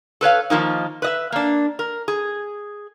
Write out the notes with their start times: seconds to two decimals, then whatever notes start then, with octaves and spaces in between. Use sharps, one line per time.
0.21 A4 B4 C#5 F5
0.50 D#3 F3 A#3 D#4
1.02 B4 D#5 E5
1.32 A#3 D4
1.79 A#4
2.08 G#4